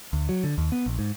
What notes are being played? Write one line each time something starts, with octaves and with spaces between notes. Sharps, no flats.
D2
F#3
D3
D#2
B3
A#1
G#2